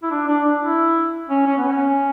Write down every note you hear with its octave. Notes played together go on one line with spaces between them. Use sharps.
E4
D4
D4
D4
E4
C#4
C#4
B3
C#4